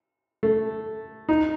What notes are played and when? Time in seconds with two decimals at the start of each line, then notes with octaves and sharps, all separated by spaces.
0.43 A3
1.29 D#4